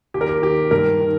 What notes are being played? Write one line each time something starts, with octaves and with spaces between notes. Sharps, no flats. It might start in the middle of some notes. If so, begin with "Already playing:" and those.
D#2 G4
A#4
G4
D#3 G4
G2 A#4
D#3